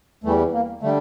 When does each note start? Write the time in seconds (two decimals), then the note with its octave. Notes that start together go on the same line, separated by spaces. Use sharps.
0.24 E2 E3 G3 A3
0.52 A#3
0.81 D3 G3 A3